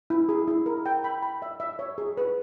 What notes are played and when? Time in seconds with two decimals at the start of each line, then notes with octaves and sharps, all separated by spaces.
0.10 E4
0.29 G#4
0.48 E4
0.66 A#4
0.86 G5
1.04 B5
1.22 B5
1.42 E5
1.60 E5
1.79 C#5
1.98 G#4
2.17 B4